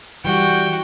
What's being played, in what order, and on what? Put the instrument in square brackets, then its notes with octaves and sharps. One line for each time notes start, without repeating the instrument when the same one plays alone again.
[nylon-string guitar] E3 G3 [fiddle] F#4 G5